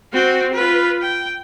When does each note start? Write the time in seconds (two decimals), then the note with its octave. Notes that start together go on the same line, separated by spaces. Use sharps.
0.13 C4 F#4
0.53 F4 B4
1.01 G5